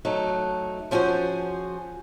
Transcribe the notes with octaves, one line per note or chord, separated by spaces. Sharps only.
F#3 A3 D#4
F3 C#4 F#4 G#4 C5